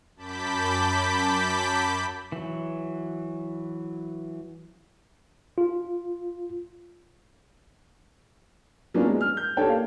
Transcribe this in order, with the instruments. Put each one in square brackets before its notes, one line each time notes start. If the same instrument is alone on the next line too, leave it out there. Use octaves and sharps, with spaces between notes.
[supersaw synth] F#2 A5 B5 D6 G6 B6
[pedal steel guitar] E3 F#3
[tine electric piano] F4
[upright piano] F#3 A#3 B3 C#4 D4 F4
G#3
F6
G6
D4 G4 A4 C#5 G5 A5
A#3 F5